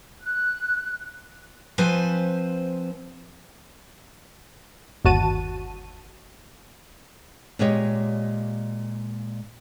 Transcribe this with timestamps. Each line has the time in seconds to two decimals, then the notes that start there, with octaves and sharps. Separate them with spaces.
0.22 F#6
1.78 F3 C4 B4 C5 G#5
5.05 G1 D#2 F#4 A5 D#7
7.59 A#2 G#3 G4 C#5 D#5